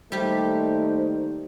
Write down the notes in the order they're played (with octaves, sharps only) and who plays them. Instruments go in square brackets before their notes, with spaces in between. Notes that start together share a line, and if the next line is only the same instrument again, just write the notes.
[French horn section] D#3 A#3 D#4 [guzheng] G3 G4 [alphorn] A3 [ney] C5